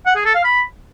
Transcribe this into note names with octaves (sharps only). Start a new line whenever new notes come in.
F#5
G#4
A4
F5
B5